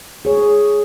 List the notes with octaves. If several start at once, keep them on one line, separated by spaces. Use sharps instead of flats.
G#4 C#5